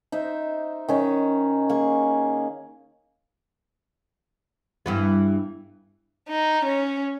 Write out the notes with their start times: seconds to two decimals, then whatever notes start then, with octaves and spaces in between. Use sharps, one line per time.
0.12 D#4 C5 D#5 E5
0.88 D#3 C#4 C#5
1.69 A#3 G#4 C#6
4.86 G2 E3 B3
6.28 D#4
6.64 C#4